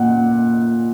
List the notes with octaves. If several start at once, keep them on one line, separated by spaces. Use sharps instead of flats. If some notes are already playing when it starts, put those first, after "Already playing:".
Already playing: A#2 F#5